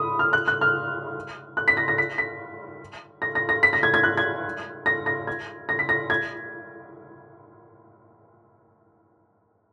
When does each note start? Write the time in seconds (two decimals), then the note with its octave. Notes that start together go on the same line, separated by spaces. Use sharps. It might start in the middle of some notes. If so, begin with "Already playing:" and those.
Already playing: B5 D#6
0.19 F6
0.33 F#6
0.48 F#6
0.61 F6
1.57 F#6
1.68 B6
1.77 A#6
1.88 A#6
1.98 B6
2.18 B6
3.22 A#6
3.35 A#6
3.49 A#6
3.63 B6
3.73 A#6
3.83 G#6
3.94 G#6
4.03 F#6
4.17 G#6
4.86 A#6
5.06 A#6
5.27 G#6
5.69 A#6
5.79 B6
5.89 A#6
6.10 G#6